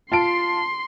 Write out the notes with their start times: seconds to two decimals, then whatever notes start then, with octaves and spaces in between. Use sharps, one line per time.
0.12 F4 A5 C6 C7 D7